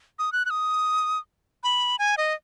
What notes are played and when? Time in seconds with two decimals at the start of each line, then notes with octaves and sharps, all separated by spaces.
0.19 D#6
0.33 F#6
0.46 F#6
0.50 D#6
1.63 B5
1.99 G#5
2.18 D#5